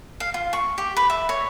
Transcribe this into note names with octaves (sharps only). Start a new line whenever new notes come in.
F5
F4
C#6
G4
B4
E5
C#5